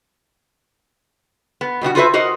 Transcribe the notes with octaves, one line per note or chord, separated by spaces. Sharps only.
B3
B2 G3 D4 F#4
F4 F#4 A4 B4 C5 E5
F#4 A#4 C5 D#5